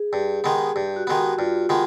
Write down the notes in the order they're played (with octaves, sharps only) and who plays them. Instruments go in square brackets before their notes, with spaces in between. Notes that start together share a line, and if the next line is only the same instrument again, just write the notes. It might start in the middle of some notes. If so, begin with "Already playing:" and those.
Already playing: [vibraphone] G#4
[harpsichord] G2 [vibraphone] G4
[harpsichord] D#3 G#3 B3
[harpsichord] G2 [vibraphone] G4
[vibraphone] F#4
[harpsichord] D#3 G#3 B3
[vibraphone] F#4
[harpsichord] G2 [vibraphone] F4
[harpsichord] D#3 G#3 B3